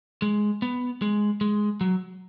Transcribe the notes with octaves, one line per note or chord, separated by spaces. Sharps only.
G#3
B3
G#3
G#3
F#3